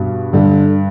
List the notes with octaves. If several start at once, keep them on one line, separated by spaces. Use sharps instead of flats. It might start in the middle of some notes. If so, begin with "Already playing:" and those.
Already playing: G2 B2
G2 D3